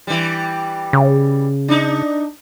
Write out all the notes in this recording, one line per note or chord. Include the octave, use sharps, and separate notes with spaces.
E3 G3
C#3
D4 D#4